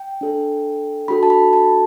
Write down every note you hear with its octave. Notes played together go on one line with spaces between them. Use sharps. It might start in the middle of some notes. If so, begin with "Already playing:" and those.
Already playing: G5
D4 A4
D4 F#4 A4 B5
A5
B5
A5